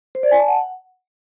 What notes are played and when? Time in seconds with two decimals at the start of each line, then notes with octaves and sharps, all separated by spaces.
0.15 C5
0.23 D5
0.31 G#5
0.40 A5
0.48 F#5